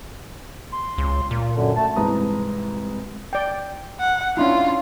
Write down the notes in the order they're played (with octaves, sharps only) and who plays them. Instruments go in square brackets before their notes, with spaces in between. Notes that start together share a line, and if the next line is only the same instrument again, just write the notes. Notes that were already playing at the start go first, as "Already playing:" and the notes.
[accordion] C6
[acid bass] C#2
A#2
[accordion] F#2 D3
A3 A5
[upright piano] C2 G#2 E3 B4 A#5 D#6
[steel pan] D5 G5
[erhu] F#5
[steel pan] C#4 D4 E4 [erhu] F4